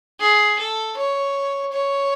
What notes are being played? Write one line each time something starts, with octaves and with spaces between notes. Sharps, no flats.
G#4
A4
C#5
C#5